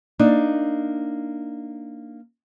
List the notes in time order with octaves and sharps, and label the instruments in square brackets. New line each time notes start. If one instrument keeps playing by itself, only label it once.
[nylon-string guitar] A#3 D4 D#4